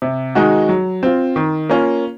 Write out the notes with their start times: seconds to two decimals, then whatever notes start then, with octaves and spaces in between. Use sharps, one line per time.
0.02 C3
0.35 D#3 G#3 D#4 F#4
0.69 F#3
1.03 C4 F4
1.36 D#3
1.70 A#3 C#4 F4